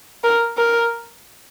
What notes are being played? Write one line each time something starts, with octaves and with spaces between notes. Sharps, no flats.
A#4
A#4